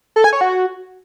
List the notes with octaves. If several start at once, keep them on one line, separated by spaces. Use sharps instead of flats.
A4
G#5
C#5
F#4